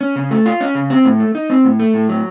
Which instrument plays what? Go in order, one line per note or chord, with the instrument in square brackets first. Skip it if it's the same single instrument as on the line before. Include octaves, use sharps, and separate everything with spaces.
[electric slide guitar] C#4
C#3
A3
F4
C#4
C#3
C4
A2
A3
D#4
C4
A2
A3
A2
F#3